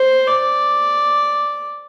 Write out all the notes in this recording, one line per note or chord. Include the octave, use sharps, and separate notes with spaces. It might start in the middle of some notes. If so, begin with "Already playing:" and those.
Already playing: C5
D5